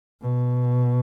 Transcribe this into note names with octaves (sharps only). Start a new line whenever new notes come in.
B2